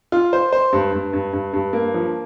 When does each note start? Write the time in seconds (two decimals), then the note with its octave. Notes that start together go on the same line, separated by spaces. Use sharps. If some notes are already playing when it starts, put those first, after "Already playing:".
0.12 F4
0.33 C5
0.52 C5
0.73 G2
0.93 G2
1.13 G2
1.33 G2
1.54 G2
1.73 A#3
1.94 F3